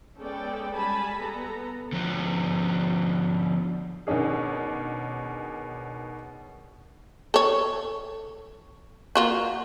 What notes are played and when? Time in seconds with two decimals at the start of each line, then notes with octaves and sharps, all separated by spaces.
0.19 G#3 B3 C#4 A4 D5 G5
0.76 G3 G#3 G#5 A5 B5
1.19 B3 A4 A#5
1.93 D3 F3 B3 B4
4.07 B2 D#3 C#4 D4 G#4
7.34 A4 C#5
9.15 A#3 F4 F#4